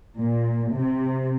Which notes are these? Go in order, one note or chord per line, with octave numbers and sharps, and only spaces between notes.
A#2
C3